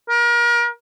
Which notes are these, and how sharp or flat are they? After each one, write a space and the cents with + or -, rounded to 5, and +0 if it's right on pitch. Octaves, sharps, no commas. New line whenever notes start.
A#4 +35